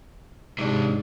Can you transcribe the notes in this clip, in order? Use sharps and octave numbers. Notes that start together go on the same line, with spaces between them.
G#2 C3 D4